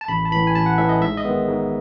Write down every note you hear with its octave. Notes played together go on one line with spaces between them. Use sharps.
A5
A1 B5
A5
A2 E3 B5
G#5
A1 A5
F#5
A2 E3 E5
D#5
G#2 E5
D#5
D#3 G#3 B3
G#2